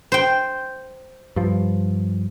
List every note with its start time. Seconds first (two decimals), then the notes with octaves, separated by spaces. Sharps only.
0.12 C5 G5
1.36 G2 F3